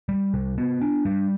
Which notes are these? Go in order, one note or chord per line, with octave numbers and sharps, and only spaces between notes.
G3
C3
B3
D4
G3